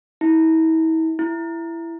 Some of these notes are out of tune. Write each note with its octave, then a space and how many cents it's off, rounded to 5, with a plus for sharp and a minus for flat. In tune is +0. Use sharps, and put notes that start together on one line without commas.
E4 -40
E4 +15